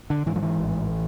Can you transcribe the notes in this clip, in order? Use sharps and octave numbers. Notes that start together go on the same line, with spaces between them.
D3
G#2 E3
F3
E3
A1